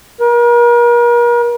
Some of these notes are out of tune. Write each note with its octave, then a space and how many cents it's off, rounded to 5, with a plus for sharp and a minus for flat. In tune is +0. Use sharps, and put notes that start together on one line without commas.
A#4 +40